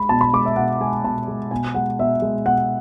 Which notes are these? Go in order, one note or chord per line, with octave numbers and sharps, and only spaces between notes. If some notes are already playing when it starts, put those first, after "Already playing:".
Already playing: G#3 B5
B2 A5
B5
G#3 D6
E5
B2 F#5
G#3 G#5
B2 A5
G#3
B2 G#5
G#3 F#5
B2 E5
G#3
B2 F#5